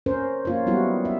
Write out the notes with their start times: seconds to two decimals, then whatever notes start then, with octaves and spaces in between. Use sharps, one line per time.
0.06 C#4 A#4 C5
0.45 A#3 F4 C#5
0.66 F#3 G3 B3 E4 F#4
1.05 E5